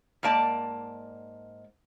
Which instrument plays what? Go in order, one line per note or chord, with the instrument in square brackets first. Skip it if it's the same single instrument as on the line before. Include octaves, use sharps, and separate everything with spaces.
[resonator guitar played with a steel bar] G#2 A#3 D5 A5